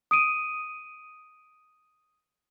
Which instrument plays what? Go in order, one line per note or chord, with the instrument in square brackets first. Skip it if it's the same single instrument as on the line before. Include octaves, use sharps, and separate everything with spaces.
[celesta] D#6 D7 D#7